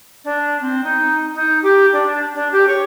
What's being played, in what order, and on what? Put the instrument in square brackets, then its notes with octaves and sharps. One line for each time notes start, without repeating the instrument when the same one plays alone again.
[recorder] D4
C4
D#4
D#4
G4
D4
D4
G4
C#5